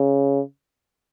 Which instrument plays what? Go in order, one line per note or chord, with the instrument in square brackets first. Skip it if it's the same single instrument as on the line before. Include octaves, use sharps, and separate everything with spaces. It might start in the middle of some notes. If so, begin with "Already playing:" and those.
Already playing: [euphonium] C#3